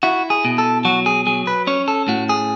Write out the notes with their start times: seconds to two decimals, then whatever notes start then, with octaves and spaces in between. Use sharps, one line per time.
0.03 E4 F#4
0.30 G#4
0.45 B2
0.58 A4
0.85 F#3 F#4
1.06 G#4
1.26 F#3 G#4
1.47 B4
1.67 C#4 C#5
1.88 A4
2.08 A2 F#4
2.29 G#4